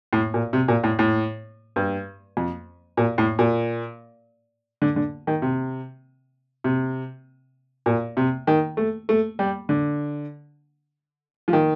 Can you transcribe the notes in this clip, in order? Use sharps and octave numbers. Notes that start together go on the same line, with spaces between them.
A2
A#2
C3
A#2
A2
A2
G2
F2
A#2
A2
A#2
D3
D3
D#3
C3
C3
A#2
C3
D#3
A3
A3
G3
D3
F3
D#3